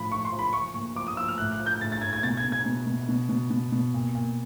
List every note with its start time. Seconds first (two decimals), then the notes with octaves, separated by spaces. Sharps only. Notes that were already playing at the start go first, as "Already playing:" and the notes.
Already playing: A2 F3 B5
0.12 F3 C#6
0.25 C6
0.32 F3
0.39 B5
0.53 F3 C#6
0.74 A#2 C#6
0.96 F3 D6
1.07 D#6
1.17 F3 E6
1.28 F6
1.38 A2 F#6
1.52 F#6
1.59 F3
1.66 G6
1.81 A2 A6
1.92 A6
2.02 A2 G#6
2.13 G#6
2.23 B2 A6
2.37 G#6
2.44 B2
2.52 G#6
2.66 B2
2.87 B2
3.09 B2
3.29 B2
3.50 B2
3.72 B2
3.94 A#2
4.15 A#2